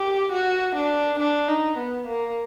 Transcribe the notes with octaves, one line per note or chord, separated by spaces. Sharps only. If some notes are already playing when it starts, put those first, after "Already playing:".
Already playing: G4
F#4
D4
D4
D#4
B3
A#3